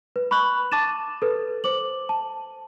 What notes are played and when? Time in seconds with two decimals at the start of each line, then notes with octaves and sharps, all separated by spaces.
0.16 B4
0.31 B5 C#6 F#6 F#7
0.72 A5 D6 A6 D#7 E7
1.22 A4 B4
1.64 C5 D6 F#7
2.09 A5